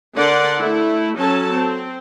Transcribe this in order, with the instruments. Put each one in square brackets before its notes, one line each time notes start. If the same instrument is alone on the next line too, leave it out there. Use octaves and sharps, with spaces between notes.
[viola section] D3 A#4 D5 F#5 C6
A3 E4
F#3 C#4 A4 A5
C4